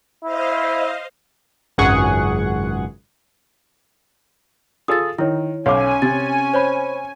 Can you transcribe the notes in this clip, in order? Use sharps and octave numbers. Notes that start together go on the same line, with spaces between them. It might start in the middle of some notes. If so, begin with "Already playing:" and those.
E4 C5 D#5 F5
G#1 C#2 F#2 G#4 F#5 C#6
F4 G#4 A4 D#6 A6
D#3 E4 C#5
B1 C#4 C#5 F5 G#5 D6
C3 A6
C5 C#5 B5